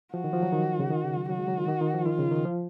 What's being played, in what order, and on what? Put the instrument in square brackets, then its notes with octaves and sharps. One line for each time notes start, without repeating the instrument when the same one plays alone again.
[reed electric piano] F3 [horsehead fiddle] F#4
[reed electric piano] D#3
F3
F#3
D#3
C#3
D#3
C#3
F#3
[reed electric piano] F#3 [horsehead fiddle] F#4
[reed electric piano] G#3
F#3
D#3
D#3
D#3
F3
[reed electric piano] D#3 [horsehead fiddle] F4
[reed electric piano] C#3
D#3
F3